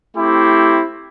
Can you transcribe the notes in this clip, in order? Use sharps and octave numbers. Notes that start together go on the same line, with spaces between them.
A3 C4 E4 G4